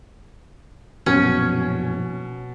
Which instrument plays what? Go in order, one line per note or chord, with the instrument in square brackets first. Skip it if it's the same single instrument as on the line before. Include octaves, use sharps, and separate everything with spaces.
[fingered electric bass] A#1 F#2 [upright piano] B2 [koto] C#4